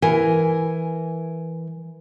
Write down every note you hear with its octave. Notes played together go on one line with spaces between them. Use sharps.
E3 A#4 G#5